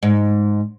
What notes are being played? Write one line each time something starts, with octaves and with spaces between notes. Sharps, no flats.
G#2